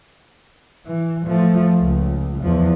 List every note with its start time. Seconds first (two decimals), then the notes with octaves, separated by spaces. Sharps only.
0.86 E3
1.26 F3 A3
1.81 C#2
2.42 E2 F3